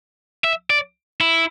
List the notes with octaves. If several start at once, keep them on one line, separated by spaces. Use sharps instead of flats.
E5
D5
E4